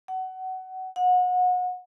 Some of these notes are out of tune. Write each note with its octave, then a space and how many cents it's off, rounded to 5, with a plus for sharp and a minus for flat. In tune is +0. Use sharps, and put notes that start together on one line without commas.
F#5 +20
F#5 -30